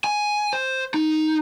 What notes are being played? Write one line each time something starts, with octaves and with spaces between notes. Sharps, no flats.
G#5
C5
D#4